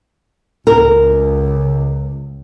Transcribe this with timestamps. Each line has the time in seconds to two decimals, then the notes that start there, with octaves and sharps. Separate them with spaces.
0.67 C#2 A#4